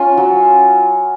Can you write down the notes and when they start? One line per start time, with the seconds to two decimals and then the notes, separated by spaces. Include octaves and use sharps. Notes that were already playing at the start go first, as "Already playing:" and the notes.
Already playing: C#4 F4
0.17 F#3